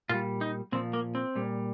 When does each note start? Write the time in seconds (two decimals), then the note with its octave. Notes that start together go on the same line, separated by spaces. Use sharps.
0.09 A#2 G3 F4
0.41 D#4
0.72 A#2 F3 C4
0.93 A#3
1.15 C4
1.35 A#2 G3